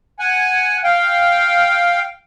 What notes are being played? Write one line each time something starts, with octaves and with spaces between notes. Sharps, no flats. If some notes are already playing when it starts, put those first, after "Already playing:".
F#5 G#5
F5 G5